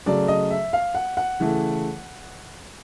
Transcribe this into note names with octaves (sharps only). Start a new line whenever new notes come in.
C#3 F#3 A3 D5
D#5
E5
F5
F#5
F#5
C#3 E3 A3